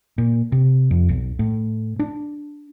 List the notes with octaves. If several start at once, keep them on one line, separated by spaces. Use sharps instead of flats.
A#2
C3
F2
B1
A2
D4